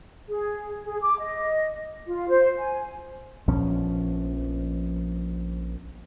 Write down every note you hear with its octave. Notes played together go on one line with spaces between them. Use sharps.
G#4
G#4
D6
D#5
F4
C5
G#5
A#1 F3 B3 C#4